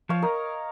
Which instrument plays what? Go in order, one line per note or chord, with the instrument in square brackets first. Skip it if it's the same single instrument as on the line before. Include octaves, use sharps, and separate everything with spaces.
[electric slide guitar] F3 [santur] C#5 F5
[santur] A#4 D#5